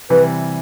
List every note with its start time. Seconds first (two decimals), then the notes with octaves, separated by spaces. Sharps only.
0.09 C3 E3 G3 B4